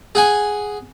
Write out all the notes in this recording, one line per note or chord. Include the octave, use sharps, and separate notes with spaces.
G#4 F#5 G#5